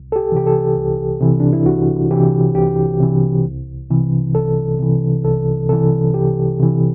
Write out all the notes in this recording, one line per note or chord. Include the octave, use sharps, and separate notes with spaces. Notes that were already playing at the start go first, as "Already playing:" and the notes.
Already playing: C2
A4
G4
C3 E3 G4
A4
C2
C3 E3
D4
E4
C2 F#4
C3 E3 G4
C2 G4
C3 E3
C2
C3 E3
C2 A4
C3 E3
C2 A4
C3 E3 A4
C2 G4
C3 E3